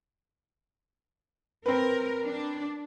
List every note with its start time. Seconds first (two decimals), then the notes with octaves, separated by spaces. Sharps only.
1.66 C4 A#4 B4
2.24 D4